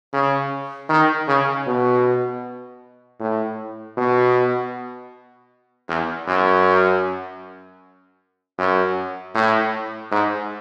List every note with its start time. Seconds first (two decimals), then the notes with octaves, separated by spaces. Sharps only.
0.13 C#3
0.89 D#3
1.28 C#3
1.66 B2
3.20 A2
3.97 B2
5.89 E2
6.27 F#2
8.58 F#2
9.34 A2
10.11 G#2